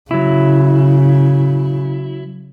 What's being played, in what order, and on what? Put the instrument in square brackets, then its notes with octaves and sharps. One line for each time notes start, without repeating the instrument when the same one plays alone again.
[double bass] C#3 [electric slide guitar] F#3 E4